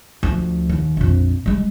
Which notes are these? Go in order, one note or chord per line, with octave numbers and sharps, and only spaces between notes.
D2 F3
D#2
A#1 F2
G3 G#3